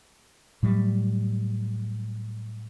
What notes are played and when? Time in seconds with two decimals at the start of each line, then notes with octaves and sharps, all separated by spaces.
0.63 A2 F#3 G3